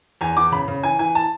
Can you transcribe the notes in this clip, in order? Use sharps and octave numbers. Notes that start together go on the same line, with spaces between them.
E2 G#5
E2 D6
C#3 B5
C#3
E3 G#5
E3 G#5
A5